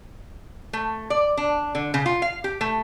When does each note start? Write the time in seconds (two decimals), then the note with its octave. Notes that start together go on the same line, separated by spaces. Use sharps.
0.73 A3
1.10 D5
1.37 D4
1.75 D3
1.94 C#3
2.06 F4
2.22 F5
2.44 G4
2.61 A3